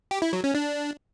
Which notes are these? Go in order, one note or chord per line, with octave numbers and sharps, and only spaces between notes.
G4
E4
F#3
C#4
D4